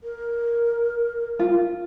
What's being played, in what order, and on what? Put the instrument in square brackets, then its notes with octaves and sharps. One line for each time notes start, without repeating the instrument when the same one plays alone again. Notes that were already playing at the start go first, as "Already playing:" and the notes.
[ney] A#4
[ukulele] F4